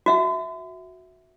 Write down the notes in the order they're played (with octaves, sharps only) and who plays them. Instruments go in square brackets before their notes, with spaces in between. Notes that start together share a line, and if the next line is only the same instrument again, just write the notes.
[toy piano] F#4 E5 F#5